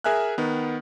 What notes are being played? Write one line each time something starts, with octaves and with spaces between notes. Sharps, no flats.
G#4 A#4 E5 G#5 F6 F#6
D#3 B3